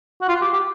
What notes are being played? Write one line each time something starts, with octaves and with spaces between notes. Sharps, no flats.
F#4
F4
G4
G4